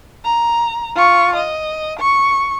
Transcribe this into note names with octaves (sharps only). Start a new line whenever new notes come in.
A#5
F4 C#6
D#5
C#6